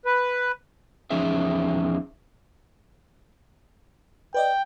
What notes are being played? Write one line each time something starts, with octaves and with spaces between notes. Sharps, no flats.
B4
E2 F3 C#4 D#4 G#4 E5
B4 D5 D#5 G5